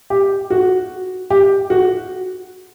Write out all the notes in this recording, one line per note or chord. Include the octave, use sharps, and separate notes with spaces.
G4
F#4
G4
F#4